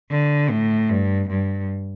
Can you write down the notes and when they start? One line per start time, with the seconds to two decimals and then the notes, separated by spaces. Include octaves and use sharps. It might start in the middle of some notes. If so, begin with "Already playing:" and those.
0.10 D3
0.50 A2
0.89 G2
1.29 G2